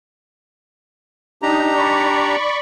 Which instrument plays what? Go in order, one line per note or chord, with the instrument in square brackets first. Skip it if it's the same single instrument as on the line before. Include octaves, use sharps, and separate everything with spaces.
[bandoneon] D4 G4 A#5 [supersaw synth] D#4
[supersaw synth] D5 B5 C#6